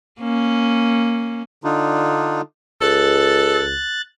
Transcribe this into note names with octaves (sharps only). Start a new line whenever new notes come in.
A#3 C#4
D3 D4 D#4 F4
C#2 A4 F#6 A6